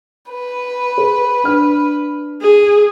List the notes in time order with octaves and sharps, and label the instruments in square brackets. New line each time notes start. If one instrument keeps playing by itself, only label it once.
[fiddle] B4
[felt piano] G#4 C5
D4 F6
[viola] G#4